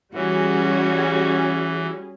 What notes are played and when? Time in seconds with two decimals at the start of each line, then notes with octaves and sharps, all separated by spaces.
0.14 E3 G3 C#4 F#4 G#4